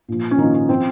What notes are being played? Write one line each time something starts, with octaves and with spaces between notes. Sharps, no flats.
A#2 F3
C#4
A#2 D#3 F3 D#4
C#4
F3 C4